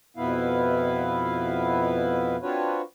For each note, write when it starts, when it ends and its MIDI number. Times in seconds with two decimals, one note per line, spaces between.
0.17 2.36 41
0.17 2.36 47
0.17 2.36 59
0.17 2.36 64
0.17 2.36 71
0.17 2.36 77
2.42 2.82 60
2.42 2.82 62
2.42 2.82 65
2.42 2.82 66
2.42 2.82 71
2.42 2.82 73